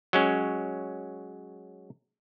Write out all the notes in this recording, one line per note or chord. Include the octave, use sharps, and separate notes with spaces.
F#3 G#3 C#4